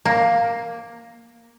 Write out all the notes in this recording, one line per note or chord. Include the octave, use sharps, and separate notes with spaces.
A#3